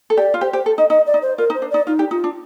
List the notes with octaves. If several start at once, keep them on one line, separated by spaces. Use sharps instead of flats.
A4
G4 D5
F4
G4 C5
G4 C5
A4
D#4 D#5
D#4 D#5
D5
D#4
C5
F4 A#4
D#4
C5
D4
D#4 D5
D#4 F4
G4
D#4 F4
D4